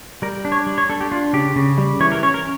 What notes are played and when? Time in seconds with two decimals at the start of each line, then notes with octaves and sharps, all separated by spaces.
0.22 G3 A#4
0.45 D4
0.52 C#5
0.66 G3
0.78 C#5
0.90 D4 A4
1.00 G4
1.12 D4 F4
1.33 C#3 G4
1.56 C#3
1.78 G3
2.00 E3 C#5
2.12 A#4
2.23 C#4 C#5
2.34 A#4